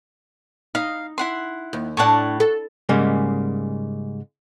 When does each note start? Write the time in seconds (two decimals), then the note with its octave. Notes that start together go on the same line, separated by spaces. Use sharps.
0.75 D#4 F5
1.18 E4 F#5 C6
1.73 D#2
1.97 A2 D4 F#5 A5 C#6
2.40 A4
2.89 G#2 C#3 G3 G#3 A#3